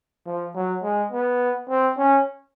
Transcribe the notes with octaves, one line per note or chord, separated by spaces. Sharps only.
F3
F#3
G#3
B3
C4
C#4